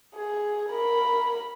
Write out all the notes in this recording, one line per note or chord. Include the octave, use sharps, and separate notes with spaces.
G#4
A#4 B5